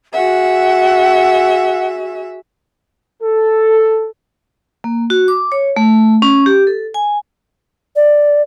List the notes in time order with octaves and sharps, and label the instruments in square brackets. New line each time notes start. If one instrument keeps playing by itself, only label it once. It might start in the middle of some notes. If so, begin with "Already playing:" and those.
[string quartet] F#4 G#4 E5 [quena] F#5
[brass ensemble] A4
[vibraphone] A#3
F#4
D6
C#5
A3
C#4
G4
A4
G#5
[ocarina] D5